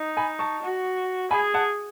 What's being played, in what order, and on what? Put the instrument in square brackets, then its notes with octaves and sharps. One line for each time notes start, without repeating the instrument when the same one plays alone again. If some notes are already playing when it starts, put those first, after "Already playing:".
Already playing: [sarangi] D#4
[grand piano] G#5 B5
A5 C#6
[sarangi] F#4
[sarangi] G#4 [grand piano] G#5 B5
[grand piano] F#5 A5